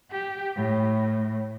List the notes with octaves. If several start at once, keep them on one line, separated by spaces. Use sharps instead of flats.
G4
A2